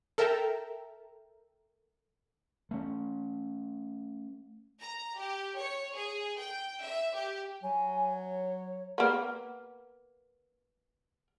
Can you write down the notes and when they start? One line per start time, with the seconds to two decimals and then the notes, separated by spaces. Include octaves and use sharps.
0.18 A4 A#4 E5 G5 A5 A#5
2.71 A3 C#4
4.80 A#5
5.17 G4
5.57 C#5
5.94 G#4
6.39 G5
6.82 E5
7.15 G4
7.63 F#3 G#5
8.10 C#5
8.98 A#3 B3